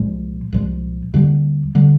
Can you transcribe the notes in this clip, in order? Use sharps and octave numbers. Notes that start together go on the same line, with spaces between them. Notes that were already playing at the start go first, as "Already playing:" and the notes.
Already playing: C2 A#2 F3 G#3
C2 A#2 F3 G#3
D#2 D3 G3
D3 G3